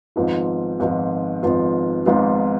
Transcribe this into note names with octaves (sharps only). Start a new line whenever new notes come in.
G#1 G#2 F3 B3 F4
G#1 G#2 F3 B3 F4
G#1 G#2 F3 B3 F4
G#1 G#2 F3 B3 F4